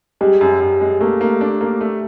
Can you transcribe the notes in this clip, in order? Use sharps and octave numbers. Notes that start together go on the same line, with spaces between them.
G3 G#3
F#2
F#2
G#3
A3 A#3
A#3
D4
A#3
A3